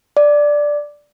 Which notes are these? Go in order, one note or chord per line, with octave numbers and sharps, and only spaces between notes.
D5